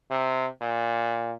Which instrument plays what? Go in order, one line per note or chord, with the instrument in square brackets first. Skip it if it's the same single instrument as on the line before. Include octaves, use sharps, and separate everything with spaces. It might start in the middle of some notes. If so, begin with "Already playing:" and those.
[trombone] C3
A#2